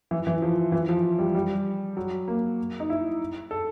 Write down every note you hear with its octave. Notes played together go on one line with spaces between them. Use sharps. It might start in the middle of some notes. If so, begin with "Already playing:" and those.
E3
E3
F3
E3
F3
G3
G3
F#3
A#3
D#4
E4
A4